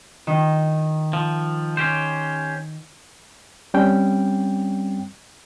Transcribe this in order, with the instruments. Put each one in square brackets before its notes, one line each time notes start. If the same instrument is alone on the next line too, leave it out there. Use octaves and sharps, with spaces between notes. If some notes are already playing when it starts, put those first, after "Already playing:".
[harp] D#3
[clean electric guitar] F3
C#4 G4 C5
[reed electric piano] G3 C4 C#4 G5